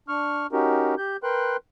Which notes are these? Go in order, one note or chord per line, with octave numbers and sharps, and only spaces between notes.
D4 C#6 F6
C#4 D#4 F#4 G4 A#4
G4 G6
A#4 B4 G5 C6 F#6